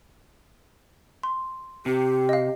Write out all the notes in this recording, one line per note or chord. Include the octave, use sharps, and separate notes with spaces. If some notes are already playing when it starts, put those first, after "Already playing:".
C6
C3 G4
D#5 F5